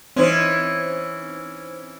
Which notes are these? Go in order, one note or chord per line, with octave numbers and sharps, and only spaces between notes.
E3 C4 C#4 D#4 C5